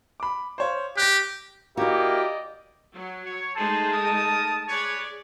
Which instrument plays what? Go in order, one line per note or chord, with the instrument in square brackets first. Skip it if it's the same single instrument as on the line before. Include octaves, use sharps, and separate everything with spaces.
[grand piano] B5 D6
C5 C#5 F5
[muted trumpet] G4 [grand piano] F#6 A#6
[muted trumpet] A#3 [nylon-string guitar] E4 F#4 [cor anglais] G4 [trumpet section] D5 D#5
[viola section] F#3
[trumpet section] C#5
[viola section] G#3 A3 D#4 [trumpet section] G#4 C5 [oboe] A5
[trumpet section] A#4 D#6
[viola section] G#4 D5 [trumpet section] B4 C#5